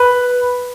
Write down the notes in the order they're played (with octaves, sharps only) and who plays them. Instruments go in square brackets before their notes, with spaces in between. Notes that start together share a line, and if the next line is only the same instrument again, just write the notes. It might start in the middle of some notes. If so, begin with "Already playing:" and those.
Already playing: [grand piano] B4